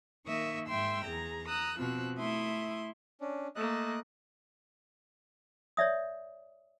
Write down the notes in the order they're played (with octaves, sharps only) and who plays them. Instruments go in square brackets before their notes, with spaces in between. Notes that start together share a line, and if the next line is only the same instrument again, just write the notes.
[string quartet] D#3 A#3 D#5 E5 C#6
G#2 E5 G5 C6 E6
E2 G#4 A#5
A#5 D#6 E6 F#6
B2 F3 C4 E6 F#6
A3 E4 E5 C6 D#6
[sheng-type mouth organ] C#4 D4
[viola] A3 A#3 [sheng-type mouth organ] D#5 F#6
[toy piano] C#5 D5 E5 D#6